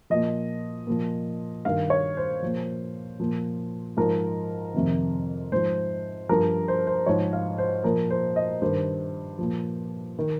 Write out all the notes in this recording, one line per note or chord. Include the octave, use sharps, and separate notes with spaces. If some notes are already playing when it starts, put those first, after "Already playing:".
A#2 F3 D#5
A#2 F3
G2 D#3 F5
C#5
C5
A#2 F3
A#2 F3
G#2 F3 A#4
F2 C3 D#3
G#2 F3 C5
G2 F3 A#4
C5
C5
G#2 F3 C#5
F5
C5
A#2 F3 A#4
C5
D#5
G2 D#3 C5
A#2 F3
D#3